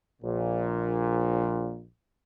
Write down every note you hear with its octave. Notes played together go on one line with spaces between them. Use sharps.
A#1 A#2